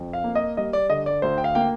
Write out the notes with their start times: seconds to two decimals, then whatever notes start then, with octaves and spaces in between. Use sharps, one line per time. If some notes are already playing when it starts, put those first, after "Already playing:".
Already playing: F2
0.13 F5
0.24 A#3
0.35 D#5
0.57 G3 D#5
0.73 D5
0.89 D3 D#5
1.06 D5
1.22 D2 C5
1.38 G5
1.44 F5
1.55 A#3 G5